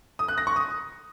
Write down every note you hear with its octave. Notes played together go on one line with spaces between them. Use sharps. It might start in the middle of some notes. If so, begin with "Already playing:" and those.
D#6
F#6
A#6
C#6
D#6